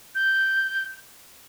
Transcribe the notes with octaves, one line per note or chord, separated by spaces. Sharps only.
G6